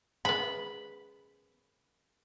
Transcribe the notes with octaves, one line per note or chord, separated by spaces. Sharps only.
G#3 B3 B5